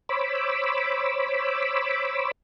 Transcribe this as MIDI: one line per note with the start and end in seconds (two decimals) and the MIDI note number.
0.09 2.31 72
0.09 2.31 73
0.09 2.31 83
0.09 2.31 86
0.09 2.31 88